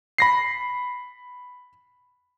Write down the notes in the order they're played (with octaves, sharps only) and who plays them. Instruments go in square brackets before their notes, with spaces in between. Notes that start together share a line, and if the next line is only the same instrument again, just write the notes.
[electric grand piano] B5 A#6 C7